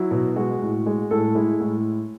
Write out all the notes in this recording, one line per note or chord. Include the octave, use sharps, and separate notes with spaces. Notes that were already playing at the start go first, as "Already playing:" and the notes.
Already playing: F#3 E4
B2
G#3 F#4
A2
G#3
A2 A4
G#3 E4
A2